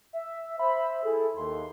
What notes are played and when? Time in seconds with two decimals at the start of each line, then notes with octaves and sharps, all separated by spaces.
0.13 E5
0.59 C5 E5 B5
1.03 E4 G#4 A4
1.36 D#2 C6